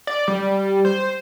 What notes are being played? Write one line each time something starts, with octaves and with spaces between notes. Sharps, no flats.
D5
G3
C5